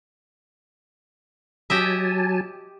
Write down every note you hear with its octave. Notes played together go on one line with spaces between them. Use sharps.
F#3 G4 D#5 E5 G#5 A5